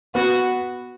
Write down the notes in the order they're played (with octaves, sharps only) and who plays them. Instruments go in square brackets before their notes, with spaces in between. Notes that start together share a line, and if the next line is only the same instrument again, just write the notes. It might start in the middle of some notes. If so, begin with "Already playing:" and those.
[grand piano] B3 B4 [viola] F#4